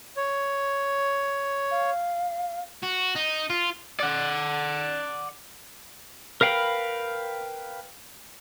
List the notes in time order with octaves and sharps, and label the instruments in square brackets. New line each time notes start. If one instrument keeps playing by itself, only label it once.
[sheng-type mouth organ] C#5
[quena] F5
[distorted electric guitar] F#4
D#4
F4
[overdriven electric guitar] D5 F#5
[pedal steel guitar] A#4 B4 F5 G5 B5